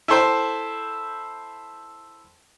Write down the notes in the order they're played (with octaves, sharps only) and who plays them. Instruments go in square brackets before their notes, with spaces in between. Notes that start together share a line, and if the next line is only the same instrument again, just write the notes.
[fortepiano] E4 A4 C5 G5